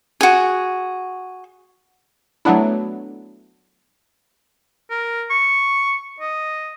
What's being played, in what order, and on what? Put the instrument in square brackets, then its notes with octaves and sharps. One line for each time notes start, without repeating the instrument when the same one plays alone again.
[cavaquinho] F#4 G#4
[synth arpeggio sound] F#3 A3 B3 D4 E4
[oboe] A#4
C#6
D#5